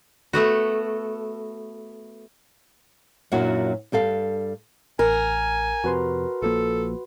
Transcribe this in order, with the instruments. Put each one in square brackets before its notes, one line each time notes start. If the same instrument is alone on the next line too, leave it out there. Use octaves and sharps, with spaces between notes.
[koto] A3 B3 F#4
[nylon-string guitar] F#2 A#2 F#3 D4 E4 F#4
G2 G4 A4 F5
[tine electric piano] A1 [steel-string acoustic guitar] A#4 [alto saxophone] G#5
[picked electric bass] F2 C3 [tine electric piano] F#4 B4 C6
[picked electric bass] A#1 F3 A#3 [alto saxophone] A4